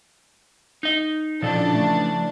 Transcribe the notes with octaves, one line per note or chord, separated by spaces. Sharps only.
D#4 D#5
A#2 C#3 E3 F3 D4 A4
A3